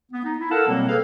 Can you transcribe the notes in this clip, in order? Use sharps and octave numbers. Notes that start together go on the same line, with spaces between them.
B3
D#4
E4
A4 A#4 F5 F#5 A5
B2 F#3 G3 A#3 C4
G#4 A4 B4 F5